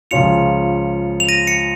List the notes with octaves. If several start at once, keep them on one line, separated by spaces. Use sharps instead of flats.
C#2 C#3 F3 C#4 F4 C#7 F7
F7
A#6 D#7
C#7 F7